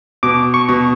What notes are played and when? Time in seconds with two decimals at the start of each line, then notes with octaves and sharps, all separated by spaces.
0.23 B2 D6
0.54 C#6
0.68 B2